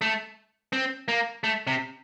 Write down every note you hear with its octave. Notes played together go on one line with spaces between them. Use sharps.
A3
C4
A#3
A3
C3